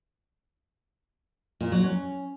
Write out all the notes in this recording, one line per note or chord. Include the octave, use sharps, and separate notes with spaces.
A#2
F#3
C#4